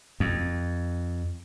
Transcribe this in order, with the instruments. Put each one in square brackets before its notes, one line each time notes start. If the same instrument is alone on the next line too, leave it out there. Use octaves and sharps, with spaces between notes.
[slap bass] F2